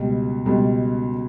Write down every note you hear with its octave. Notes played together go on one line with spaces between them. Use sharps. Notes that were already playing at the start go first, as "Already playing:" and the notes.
Already playing: C#2 B2 G3
C#2 B2 G3